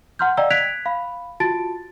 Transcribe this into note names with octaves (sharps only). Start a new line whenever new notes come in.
F#5 A#5 C6 F6 G6
D5 D#5 F5 G5 A#5 E6
F#6 G#6 B6 D7 F7
F5 B5
F4 F#4 A5 A6 D7